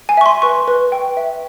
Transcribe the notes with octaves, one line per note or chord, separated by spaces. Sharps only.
G#5
E5 C#6
C6
B4 C#6
B4
G5
E5